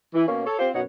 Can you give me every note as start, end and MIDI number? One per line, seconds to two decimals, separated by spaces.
0.15 0.25 52
0.28 0.43 47
0.28 0.43 58
0.28 0.43 61
0.46 0.57 69
0.46 0.57 73
0.59 0.70 60
0.59 0.70 65
0.59 0.70 67
0.59 0.70 72
0.75 0.83 42
0.75 0.83 47
0.75 0.83 63
0.75 0.83 73
0.75 0.83 78